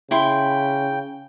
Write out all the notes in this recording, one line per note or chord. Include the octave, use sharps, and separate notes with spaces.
C#3 E4 G5 C6